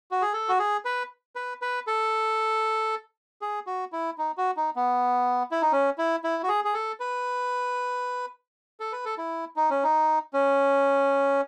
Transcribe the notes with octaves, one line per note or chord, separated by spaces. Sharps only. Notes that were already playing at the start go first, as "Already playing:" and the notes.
F#4
G#4
A4
F#4
G#4
B4
B4
B4
A4
G#4
F#4
E4
D#4
F#4
D#4
B3
E4
D#4
C#4
E4
E4
F#4
G#4
G#4
A4
B4
A4
B4
A4
E4
D#4
C#4
D#4
C#4